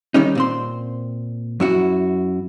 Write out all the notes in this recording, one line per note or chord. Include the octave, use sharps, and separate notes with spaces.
D#3 G3 C#4 D#4
A#2 C4 C6
F#2 E4 F#4